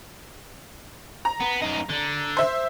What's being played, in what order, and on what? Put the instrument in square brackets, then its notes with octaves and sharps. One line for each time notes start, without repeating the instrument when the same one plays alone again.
[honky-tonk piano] A#5
[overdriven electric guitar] B3
F#2 D#4
D3
[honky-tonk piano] C5 E5